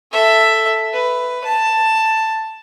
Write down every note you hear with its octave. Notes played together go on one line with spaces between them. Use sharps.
A4 E5
B4
A5